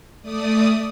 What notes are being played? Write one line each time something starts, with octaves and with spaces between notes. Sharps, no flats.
A3 D5 D#6